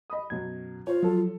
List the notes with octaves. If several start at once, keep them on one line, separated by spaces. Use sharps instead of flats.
D#5 B5 D#6
F#2 B2 F#3 G#6
F4 C5 C#5
F3 F#3 A4